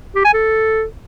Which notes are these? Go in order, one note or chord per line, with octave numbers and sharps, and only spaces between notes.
G4
G#5
A4